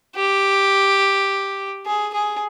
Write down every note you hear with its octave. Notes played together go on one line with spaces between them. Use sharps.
G4
G#4
G#4